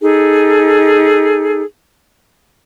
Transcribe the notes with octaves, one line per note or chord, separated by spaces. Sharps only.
D#4 G#4 A4